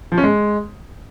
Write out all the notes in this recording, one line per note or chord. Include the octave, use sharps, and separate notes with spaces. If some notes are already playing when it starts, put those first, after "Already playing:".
F3
C#4
G#3